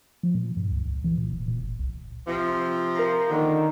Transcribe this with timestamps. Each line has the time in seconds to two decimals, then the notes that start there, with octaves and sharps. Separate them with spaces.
0.23 F3
0.35 A#2
0.57 G2
0.71 C#2
0.86 C#2
1.04 E3
1.18 A#2
1.32 D1
1.48 A#2
1.64 F#1
1.79 C2
2.28 C3 F3
2.95 A#4 A#5
3.31 A#2 D3 D#3